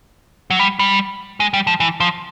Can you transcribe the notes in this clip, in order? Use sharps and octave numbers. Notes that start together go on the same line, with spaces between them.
F#3
G3
G3
G#3
G3
F3
E3
F3